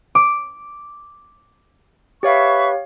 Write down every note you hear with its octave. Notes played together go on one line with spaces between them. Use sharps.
D6
G4 B4 C#5 E5 F5 C#6